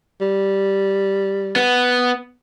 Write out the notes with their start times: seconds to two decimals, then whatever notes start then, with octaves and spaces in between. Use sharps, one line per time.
0.21 G3
1.56 B3